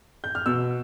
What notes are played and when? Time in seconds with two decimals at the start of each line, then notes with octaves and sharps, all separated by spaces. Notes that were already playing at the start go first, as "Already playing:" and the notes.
0.24 G6
0.35 F6
0.46 B2 E6